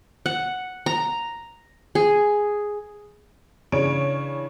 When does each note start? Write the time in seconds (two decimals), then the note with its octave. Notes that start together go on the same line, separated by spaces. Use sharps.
0.26 F#5
0.86 A#5
1.95 G#4
3.72 C#3 E3 D4 C#5 D7